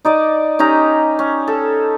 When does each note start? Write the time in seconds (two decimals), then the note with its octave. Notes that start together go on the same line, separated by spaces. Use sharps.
0.05 D#4 D5 D#5
0.59 C#4 D#4 G4 A#5
1.19 C#4
1.48 A4